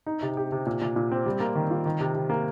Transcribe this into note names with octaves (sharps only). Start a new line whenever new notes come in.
D#4
C3
G4
C3
A#2
A#2
A#2
C4
G3
A#3
D#3
F4
D#3
C3
C3
A#3